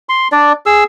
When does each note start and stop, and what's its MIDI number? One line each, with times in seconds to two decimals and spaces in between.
0.09 0.28 84
0.32 0.53 62
0.32 0.53 74
0.66 0.84 68
0.66 0.84 88